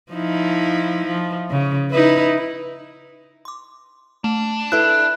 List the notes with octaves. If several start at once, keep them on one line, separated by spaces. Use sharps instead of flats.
F3 D#4 E4
F3
C#3
D#4 E4 B4
C6 D6
A3 D4
E4 A4 B4 B5 F#6